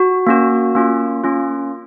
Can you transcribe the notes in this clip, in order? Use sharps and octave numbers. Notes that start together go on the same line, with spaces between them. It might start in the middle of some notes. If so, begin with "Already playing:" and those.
Already playing: F#4
A#3 C#4 F#4
A#3 C#4 F4
A#3 C#4 F4